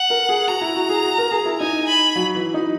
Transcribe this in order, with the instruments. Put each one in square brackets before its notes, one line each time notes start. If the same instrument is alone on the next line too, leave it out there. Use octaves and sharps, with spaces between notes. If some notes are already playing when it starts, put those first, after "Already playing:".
Already playing: [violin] F#5
[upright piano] A#4
G#4
[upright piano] F#4 [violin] A#5
[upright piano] E4
F#4
G#4
F#4
A#4
G#4
E4
[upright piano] D#4 [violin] G#5
[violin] B5
[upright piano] F#3
E3
D#4